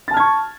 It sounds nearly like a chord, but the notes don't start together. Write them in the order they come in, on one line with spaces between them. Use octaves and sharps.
A6 A5 F6 G#6 C#6